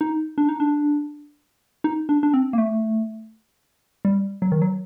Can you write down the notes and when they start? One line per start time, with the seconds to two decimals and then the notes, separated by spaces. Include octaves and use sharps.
0.01 D#4
0.38 D4
0.49 D#4
0.60 D4
1.84 D#4
2.09 D4
2.23 D4
2.34 C4
2.53 A#3
2.58 A3
4.05 G3
4.42 F#3
4.52 D#3
4.62 F#3